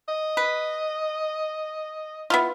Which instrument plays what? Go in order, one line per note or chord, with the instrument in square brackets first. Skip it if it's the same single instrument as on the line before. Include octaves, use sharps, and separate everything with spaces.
[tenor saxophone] D#5
[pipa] B4
B3 E4 F4